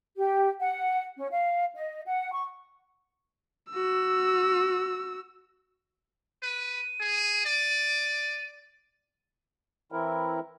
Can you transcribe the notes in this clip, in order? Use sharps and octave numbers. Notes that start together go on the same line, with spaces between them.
G4
F#5
C#4
F5
D#5
F#5
C#6
F#4 E6
B4 D#7
G#4
D5
E3 C4 E4 A#4